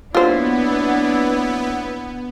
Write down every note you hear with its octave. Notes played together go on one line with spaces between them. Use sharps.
F#3 A#3 B3 D4 E4 F4 C5